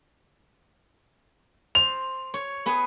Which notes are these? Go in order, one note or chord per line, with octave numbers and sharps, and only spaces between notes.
C5 F7
C#5
B3 G#4 B4